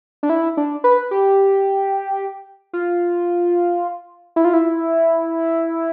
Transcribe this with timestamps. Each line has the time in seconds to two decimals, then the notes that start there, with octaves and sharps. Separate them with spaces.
0.23 D4
0.30 E4
0.57 D4
0.84 B4
1.11 G4
2.73 F4
4.36 E4
4.45 F4
4.53 E4